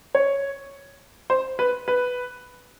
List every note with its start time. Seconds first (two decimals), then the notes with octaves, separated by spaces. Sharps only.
0.15 C#5
1.30 C5
1.59 B4
1.88 B4